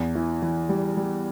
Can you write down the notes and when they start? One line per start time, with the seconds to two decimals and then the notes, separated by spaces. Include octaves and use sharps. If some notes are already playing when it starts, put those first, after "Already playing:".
Already playing: E2
0.15 E3
0.42 E3
0.69 G3
0.97 G3